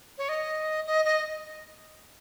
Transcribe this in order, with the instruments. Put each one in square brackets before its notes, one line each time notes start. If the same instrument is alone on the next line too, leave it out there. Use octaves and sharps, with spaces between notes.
[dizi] C#5
D#5
D#5
D#5